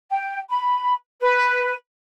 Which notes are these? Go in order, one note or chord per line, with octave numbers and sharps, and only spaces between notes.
G5
B5
B4